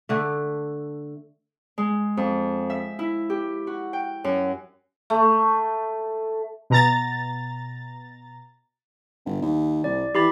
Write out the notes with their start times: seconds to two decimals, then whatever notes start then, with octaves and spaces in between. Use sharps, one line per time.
0.09 D3 A3
1.78 G#3
2.17 F2
2.70 E5
2.99 E4
3.30 G4
3.67 F#4
3.93 G5
4.24 F#2
5.10 A3
6.70 B2 A#5 A6
9.26 G1
9.42 D#2
9.84 C2 D5
10.15 E3 G4 B5 A6